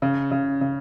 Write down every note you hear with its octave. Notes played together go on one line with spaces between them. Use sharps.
C#3
C#3
C#3